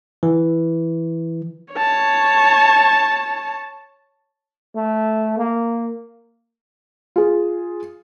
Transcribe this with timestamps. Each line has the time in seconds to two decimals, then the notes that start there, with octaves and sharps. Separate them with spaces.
0.23 E3
1.74 C#5 A5
4.76 A3
5.37 A#3
7.16 F4 G#4